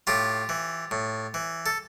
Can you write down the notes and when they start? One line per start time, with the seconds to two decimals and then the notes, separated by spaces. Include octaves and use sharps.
0.07 A2 F4 G4
0.49 E3
0.91 A2
1.34 E3
1.66 A4